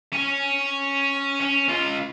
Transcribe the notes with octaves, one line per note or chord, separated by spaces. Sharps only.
C#4
C#4
C#2 F4